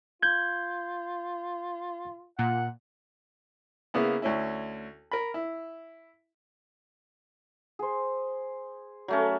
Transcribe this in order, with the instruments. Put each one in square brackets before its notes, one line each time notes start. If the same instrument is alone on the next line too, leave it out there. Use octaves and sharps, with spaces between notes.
[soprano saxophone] F4 [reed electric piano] G6 G#6
[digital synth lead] A#2 [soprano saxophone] F#5
[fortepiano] C#3 A#3 B3 E4
D2 C#4 E4
A#4 B5
E4
[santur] G#4 C5
[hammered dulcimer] F#3 A3 C#4